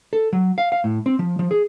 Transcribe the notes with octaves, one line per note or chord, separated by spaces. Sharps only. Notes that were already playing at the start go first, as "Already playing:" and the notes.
A4
F#3
F5
F5
A2
C4
F3
F3
G#4